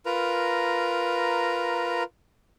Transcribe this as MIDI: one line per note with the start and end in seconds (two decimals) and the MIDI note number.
0.06 2.03 65
0.06 2.03 70
0.06 2.03 71
0.06 2.03 82